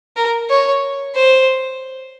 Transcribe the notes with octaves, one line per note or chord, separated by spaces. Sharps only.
A#4
C#5
C5